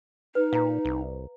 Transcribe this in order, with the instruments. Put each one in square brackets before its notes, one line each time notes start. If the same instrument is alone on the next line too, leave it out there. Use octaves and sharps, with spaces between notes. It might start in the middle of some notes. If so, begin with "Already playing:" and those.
[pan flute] D#4 [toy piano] B4
[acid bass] A#2 [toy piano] F5 A#5
[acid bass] C2